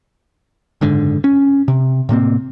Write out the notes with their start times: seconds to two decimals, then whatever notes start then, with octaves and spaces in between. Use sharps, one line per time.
0.81 F#1 G#2 D3
1.24 C#4
1.68 C3
2.09 A2 C3 A#3 C4